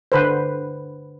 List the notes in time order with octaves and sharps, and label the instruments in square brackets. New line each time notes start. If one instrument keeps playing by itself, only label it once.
[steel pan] D3 B4 C5